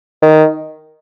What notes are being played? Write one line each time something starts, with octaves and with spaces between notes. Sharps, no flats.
D#3